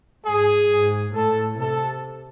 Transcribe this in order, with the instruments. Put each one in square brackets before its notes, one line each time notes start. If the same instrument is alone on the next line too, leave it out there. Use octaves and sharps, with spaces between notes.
[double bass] G#2 [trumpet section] G#4
[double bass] G#2
[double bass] A2 [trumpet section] A4
[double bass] C3 [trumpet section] A4